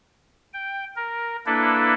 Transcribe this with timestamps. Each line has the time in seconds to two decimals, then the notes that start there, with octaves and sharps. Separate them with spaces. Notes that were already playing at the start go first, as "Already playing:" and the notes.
0.53 G5
0.96 A#4
1.46 A#3 D4 E4 A4 B4